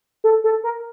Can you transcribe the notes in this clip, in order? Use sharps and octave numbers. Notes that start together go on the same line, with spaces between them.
A4
A4
A#4